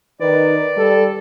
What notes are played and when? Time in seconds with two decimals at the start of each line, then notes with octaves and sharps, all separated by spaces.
0.21 D#3 B4 D5
0.77 G3 A4